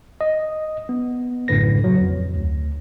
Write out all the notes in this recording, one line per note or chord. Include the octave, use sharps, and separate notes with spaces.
D#5
B3
A#1 F#2 A2 D3 B4 A#6
C#3 F#3
F2
D2